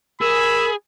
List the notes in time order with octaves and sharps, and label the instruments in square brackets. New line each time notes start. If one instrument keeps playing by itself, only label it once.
[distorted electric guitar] G#4 [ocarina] A#4 [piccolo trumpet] B5 [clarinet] E6